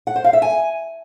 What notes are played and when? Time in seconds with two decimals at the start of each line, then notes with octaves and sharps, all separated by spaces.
0.07 F#5
0.16 C5
0.24 F5
0.33 E5
0.42 G#5